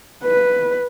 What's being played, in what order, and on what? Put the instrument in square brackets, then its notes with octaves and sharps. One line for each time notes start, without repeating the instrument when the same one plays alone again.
[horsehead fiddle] B4